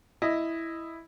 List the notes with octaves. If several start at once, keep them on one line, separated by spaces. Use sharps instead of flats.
E4 D#5